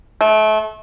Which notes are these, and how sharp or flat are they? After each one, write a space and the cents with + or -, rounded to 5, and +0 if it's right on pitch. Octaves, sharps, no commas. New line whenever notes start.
A3 -30